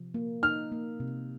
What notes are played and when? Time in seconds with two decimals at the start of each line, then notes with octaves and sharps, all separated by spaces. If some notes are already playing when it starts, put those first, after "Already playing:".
Already playing: C3 F3
0.14 A#3
0.43 D#4 F6
0.72 A#3
1.00 C3